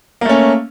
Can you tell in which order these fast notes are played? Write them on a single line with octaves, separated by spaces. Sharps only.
A#3 A3 C#4